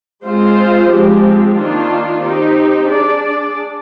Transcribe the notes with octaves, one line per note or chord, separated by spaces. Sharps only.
G#3 C4 F4 C5
F3 G#3 C4 G4
D#3 A#3 D4 F4
C4 D#4 G4
D4 G#4 D5